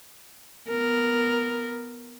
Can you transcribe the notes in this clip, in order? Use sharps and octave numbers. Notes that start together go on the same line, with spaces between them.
B3 A#4